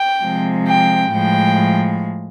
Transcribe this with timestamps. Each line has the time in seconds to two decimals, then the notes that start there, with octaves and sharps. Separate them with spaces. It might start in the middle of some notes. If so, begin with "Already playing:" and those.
Already playing: G5
0.22 C3 F3 G#3
0.67 G5
1.12 A2 F3 G#3 G5